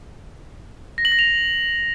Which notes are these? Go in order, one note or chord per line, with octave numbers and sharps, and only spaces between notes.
A#6
F#7
A#6
F7